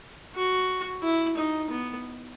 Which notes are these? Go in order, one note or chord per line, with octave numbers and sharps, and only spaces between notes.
F#4
E4
D#4
B3